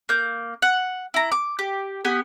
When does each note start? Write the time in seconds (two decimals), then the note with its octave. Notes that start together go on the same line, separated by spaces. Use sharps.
0.09 A#3 G6
0.62 F#5
1.14 E4 A#5
1.32 D6
1.59 G4
2.04 B3 G4 G#5